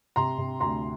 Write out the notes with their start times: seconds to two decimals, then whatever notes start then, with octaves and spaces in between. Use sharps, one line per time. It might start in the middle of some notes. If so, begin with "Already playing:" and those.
0.16 C3 A#5 C6
0.38 C3
0.60 D2 A#5 C6